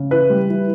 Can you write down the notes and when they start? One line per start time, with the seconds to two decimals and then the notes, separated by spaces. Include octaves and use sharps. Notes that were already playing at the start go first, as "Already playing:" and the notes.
Already playing: C#3
0.11 E3 B4
0.30 G3
0.49 E3